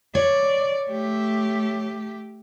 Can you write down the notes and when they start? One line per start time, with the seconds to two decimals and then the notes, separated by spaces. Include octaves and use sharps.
0.15 C#5 D5
0.91 A3 G4